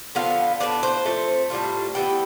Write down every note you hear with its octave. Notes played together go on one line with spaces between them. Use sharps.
D3 F3 B3 F4 F5
A2 F3 B3 D4 D5
C5
F3 A3 C4
A2 G3 D4 F4
E3 G3 B3 E4 G5